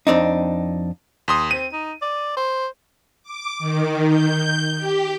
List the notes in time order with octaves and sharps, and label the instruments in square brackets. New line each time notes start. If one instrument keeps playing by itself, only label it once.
[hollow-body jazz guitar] F2 C4 D4 D#4
[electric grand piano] D#2 C6 D#6
[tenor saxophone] C4 [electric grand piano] D#7
[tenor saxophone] D#4
D5
C5
[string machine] D6
D#3
G6
G4